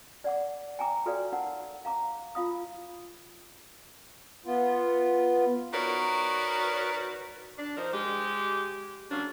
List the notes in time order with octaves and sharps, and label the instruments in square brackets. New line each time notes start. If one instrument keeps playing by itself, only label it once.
[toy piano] D5 F#5 D6
G5 G#5 A#5 D6
F#4 A4 B4 C#5 D5 F5
D#4 A#4 F#5
F5 A#5 D6
F4 F5 D#6
[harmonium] B3 F4
[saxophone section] D#4 F#4 A#4 B4 C#5 D5
D4
F3 D#4 A#4 C5
G#3 G4
C#3 F#3 A#3 C#4 D4